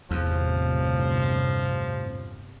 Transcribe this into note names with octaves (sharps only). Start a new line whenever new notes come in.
G1 E2 A2 C3 F3